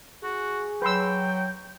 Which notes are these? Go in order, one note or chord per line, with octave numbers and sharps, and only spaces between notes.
F#4 G#4
F#3 B4 G5 C6 E6